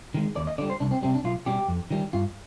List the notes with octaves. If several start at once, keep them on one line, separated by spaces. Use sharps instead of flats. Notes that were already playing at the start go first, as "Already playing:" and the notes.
D#3 G#3
D#2 D5
D#5
D3 G3 D5
C5
C2 D4
C4
C3 G3 C4
D4
B1 F4
B2 G3 G4
F2
D#3 G3
G2 F4